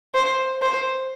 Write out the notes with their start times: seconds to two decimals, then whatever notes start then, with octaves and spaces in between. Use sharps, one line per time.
0.14 C5
0.62 C5